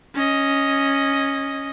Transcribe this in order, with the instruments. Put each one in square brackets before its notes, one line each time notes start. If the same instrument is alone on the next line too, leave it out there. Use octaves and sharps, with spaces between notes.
[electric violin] C#4 D#5